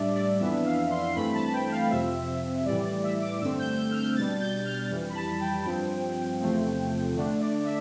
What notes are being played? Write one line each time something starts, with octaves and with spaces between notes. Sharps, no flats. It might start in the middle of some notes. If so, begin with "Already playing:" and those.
Already playing: A2 G3 D4 D5 E5
D5
F2 E3 B3 D4 E5
F5
C6
G2 E3 A3 C4 B5
A5
A5
G5
F5
F2 C3 F3 C4 E5
A2 E3 G3 D5
D5
E5
D6
G2 D3 A3 C4 E6
G6
G6
F6
G6
B2 G3 D4 A6
G6
F6
F2 E3 G3
B5
A5
G5
G2 F3 C4
E2 C3 F3 A3 C4
D3 A3 D4
D5
E5